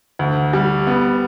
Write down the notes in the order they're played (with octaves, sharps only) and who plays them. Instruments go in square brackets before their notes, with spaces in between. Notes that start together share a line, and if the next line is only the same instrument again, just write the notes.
[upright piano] D2
G3
B3